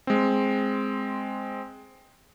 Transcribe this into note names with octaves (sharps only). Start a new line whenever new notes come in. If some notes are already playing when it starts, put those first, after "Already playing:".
G#3 C4